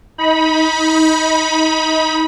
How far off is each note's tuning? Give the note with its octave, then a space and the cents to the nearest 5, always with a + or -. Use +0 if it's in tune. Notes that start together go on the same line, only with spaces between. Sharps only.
D#4 +25 B5 -20